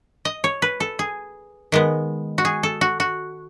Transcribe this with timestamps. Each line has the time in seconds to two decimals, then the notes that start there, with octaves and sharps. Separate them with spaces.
0.25 D#5
0.44 C#5
0.62 B4
0.80 A4
0.99 G#4
1.72 D#3 G#3 B3
2.38 F#4
2.45 G#4
2.63 A4
2.81 F#4
3.00 F#4